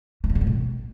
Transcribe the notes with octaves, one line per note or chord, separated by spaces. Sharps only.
E3
G2
G#2
A2
B2